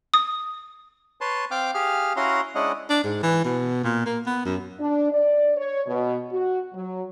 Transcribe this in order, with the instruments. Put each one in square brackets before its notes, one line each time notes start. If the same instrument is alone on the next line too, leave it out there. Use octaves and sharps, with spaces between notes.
[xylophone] D#6
[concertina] B4 C#5 A5 C6
C4 F5 G5 D6 F6
G4 G#4 F5 F6
C#4 E4 F#4 F5 A#5 C6
G#3 C#4 D4 E4 D#5 F#5
[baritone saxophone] D4
G#2
E3
B2
A#2
A#3
B3
F#2
[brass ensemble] D4
D5
C#5
B2
F#4
F#3